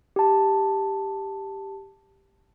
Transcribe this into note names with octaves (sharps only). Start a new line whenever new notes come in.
G4 A5